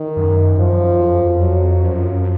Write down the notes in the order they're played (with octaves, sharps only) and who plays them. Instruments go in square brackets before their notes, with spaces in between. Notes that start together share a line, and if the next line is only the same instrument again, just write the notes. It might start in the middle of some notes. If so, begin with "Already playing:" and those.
Already playing: [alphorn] D#3
[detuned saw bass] F#2
[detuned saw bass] F#2 [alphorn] F3
[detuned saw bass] F2
F#2
F2
[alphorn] F#3
[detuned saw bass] F#2 [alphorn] F3